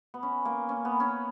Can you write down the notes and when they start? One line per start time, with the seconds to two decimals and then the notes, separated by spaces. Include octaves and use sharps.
0.14 B3
0.23 C#4
0.45 A#3
0.69 C#4
0.85 B3
1.00 C#4